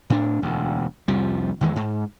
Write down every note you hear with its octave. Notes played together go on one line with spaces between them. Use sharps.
A2 D4
E1 D2
C2 F2 F3 G3
E2 D#3 E3 G#3
G#2